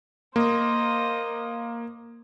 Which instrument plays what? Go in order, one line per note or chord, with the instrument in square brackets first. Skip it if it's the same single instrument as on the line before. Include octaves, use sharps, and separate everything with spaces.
[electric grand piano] A#3 [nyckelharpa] C5 D#5